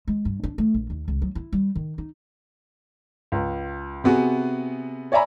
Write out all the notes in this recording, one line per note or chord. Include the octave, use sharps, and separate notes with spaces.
G#3
G2
D4
A3
A#1
D#2
C#2
F#3
E4
G3
D#3
D#4
C#2
C3 B3 F#4 G#4
C#5 D5 E5 G#5 A#5 B5